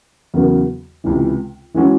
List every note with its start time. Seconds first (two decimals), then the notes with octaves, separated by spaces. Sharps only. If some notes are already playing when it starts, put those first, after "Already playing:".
0.34 E2 C#3 F#3 A#3
1.04 C#2 C3 E3
1.74 E3 G#3 C#4 F#4